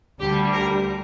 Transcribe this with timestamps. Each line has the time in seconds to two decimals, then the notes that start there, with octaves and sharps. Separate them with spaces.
0.19 D2 D3 G3 G4
0.53 A#4